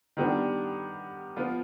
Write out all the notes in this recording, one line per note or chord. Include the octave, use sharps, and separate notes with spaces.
D#3 G3 B3 D4
F3 B3 F4